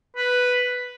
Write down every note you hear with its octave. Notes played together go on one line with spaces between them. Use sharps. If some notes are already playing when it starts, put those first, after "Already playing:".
B4